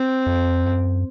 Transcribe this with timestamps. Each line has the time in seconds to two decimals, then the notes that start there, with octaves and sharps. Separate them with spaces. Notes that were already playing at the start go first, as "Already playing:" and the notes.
Already playing: C4
0.26 F2
0.65 F#2